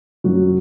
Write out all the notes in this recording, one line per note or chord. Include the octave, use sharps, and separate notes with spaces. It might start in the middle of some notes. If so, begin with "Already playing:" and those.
F#2 F#3 F#4